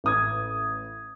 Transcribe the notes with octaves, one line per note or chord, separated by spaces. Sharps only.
A1 D#6 G#6